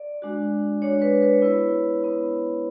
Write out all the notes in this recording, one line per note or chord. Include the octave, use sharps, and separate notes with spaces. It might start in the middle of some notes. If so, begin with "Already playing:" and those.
Already playing: D5
G#3 D4 F#4
G#3 D4 F#4 C#5
B4
B4
C#5
B3 E4 B4
B3 E4